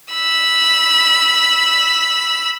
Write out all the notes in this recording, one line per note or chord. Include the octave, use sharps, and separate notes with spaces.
B5 E6